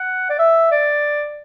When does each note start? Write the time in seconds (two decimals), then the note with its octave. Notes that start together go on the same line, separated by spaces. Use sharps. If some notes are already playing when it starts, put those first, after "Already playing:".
Already playing: F#5
0.29 D5
0.39 E5
0.71 D5